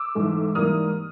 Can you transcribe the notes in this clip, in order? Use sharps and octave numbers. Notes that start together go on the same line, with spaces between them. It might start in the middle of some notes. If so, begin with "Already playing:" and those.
Already playing: D6 E6
G#2 E3 A3
G#2 E3 G3 A#3 D#6 F6